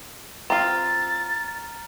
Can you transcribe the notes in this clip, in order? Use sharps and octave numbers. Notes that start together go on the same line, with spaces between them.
C4 F4 A#5 F6 A6